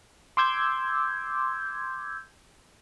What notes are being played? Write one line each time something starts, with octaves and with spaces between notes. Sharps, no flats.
C6 D6 E6 G6 G#6